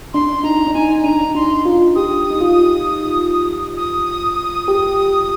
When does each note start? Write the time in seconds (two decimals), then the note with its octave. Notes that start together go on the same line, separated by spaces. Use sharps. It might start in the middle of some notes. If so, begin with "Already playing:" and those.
0.14 D4 C6
0.44 D#4 A#5
0.67 D4
0.74 D#4 G#5
1.04 D4 A#5
1.35 D#4 C6
1.65 F4
1.95 G4 D#6
2.30 D#4
2.41 F4
3.77 D#6
4.68 G4